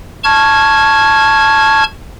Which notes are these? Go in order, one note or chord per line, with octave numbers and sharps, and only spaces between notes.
A5 C#6 F6 G#6